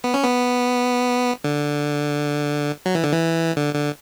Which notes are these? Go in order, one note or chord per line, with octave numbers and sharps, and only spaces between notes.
B3
C#4
B3
D3
F#3
E3
D3
E3
D3
D3